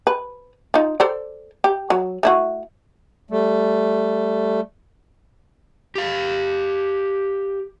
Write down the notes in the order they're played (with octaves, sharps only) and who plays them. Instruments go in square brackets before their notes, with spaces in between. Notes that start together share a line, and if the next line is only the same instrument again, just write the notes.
[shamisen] B4
D#4 F4
A4 C5 D5
G4
F#3
A3 E4 F#4
[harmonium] G3 A3
[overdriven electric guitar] G4 F5